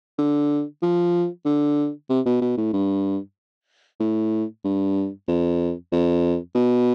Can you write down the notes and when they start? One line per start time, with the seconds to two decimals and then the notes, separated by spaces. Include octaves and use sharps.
0.18 D3
0.82 F3
1.45 D3
2.09 C3
2.26 B2
2.41 B2
2.57 A2
2.73 G2
4.00 A2
4.64 G2
5.28 F2
5.92 F2
6.55 B2